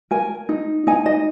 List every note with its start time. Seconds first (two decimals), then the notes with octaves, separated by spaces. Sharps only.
0.11 A#4 G#5
0.49 D#4
0.87 D#4 G#5
1.06 D#5